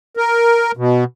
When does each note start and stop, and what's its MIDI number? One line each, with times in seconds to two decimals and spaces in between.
0.17 0.72 70
0.77 1.04 47